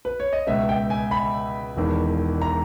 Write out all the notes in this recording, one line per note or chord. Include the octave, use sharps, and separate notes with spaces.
B4
C#5
D#5
C#2 B2 E5
G5
G#5
B5
E1 E2 D#3
A#5